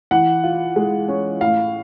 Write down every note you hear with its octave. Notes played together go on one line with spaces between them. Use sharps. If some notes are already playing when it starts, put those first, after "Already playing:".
E3 F#5
F4
G#3
C#4
A2 F5